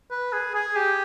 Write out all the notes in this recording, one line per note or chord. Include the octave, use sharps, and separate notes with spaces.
B4
G#4
G#4
G4